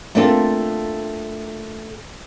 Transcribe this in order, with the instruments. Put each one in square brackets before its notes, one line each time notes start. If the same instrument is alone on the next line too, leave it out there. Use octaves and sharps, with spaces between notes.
[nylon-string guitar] A3 A#3 C4 D4 F4 A4